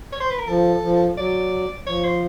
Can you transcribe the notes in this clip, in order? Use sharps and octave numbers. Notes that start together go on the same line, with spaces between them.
C#5
C5
B4
A#4
F3 A4
F3
F#3 D5
F3 C#5
C5